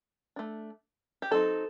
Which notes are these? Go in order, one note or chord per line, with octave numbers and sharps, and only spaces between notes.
A3 D4
G4
F#3 C4 D#4 A4